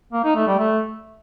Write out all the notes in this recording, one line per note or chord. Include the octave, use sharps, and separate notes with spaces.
A#3
D#4
A3
G3
A3